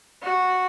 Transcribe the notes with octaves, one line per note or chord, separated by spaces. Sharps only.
F#4